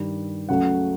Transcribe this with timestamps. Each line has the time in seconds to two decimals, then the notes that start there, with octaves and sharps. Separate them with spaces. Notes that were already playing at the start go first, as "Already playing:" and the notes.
Already playing: G2 D#3 G3
0.49 C#2 C#3 F#3 A3 F#5